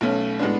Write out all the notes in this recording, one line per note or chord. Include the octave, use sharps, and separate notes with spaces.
B1 B2 A3 C#4
A2 G#3 B3 D4